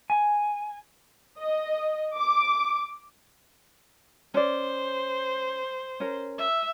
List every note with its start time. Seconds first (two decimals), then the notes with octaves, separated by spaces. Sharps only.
0.10 G#5
1.39 D#5
2.16 D6
4.34 C#4 C5 D5
6.00 C#4 A#4
6.38 E5